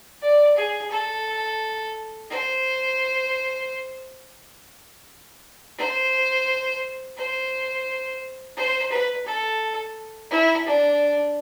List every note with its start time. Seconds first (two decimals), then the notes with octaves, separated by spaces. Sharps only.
0.22 D5
0.56 G#4
0.91 A4
2.30 C5
5.78 C5
7.17 C5
8.57 C5
8.91 B4
9.26 A4
10.31 E4
10.65 D4